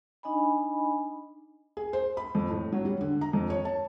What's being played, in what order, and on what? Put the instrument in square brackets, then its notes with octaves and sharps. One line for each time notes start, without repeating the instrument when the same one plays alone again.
[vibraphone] D4 D#4 D#5 G#5 B5
[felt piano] G#4
C5
B5
F2
A2
F#3
G3
D3
A#5
F2
C#5
A5